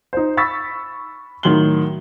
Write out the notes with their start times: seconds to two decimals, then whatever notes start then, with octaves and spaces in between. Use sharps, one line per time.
0.13 D#4 C5
0.37 B5 C#6 E6 A6 B6
1.43 A2 D#3 F#3 C6 F#7 G7